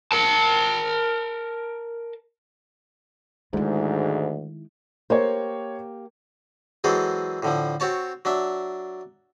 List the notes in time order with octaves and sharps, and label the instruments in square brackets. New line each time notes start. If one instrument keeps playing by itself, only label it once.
[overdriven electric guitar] A#4 A5
[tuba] D2 [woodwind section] G#2 [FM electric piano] D#3 E4 [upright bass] G#3 D#4
[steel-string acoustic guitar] A#3 G4 [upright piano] C5 C#5
[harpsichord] E3 F#3 G#3 C4 G#4 A4
A2 D3 F3
C4 F#4 C#5 A5
F#3 D4 E5